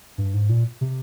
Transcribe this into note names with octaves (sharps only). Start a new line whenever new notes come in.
G2
G#2
A#2
C3